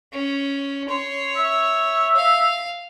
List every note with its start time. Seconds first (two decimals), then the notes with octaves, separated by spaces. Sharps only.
0.12 C#4
0.89 C#5 C6
1.36 E5
2.16 F5